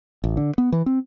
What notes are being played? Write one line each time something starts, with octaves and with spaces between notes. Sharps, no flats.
A1
D3
B3
E3
C4